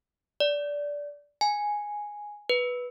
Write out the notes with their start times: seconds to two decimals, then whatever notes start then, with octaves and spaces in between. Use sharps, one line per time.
0.40 D5
1.41 G#5
2.49 B4